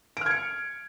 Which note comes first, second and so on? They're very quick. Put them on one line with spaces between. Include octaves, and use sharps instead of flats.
D7 F6 G#6 C#7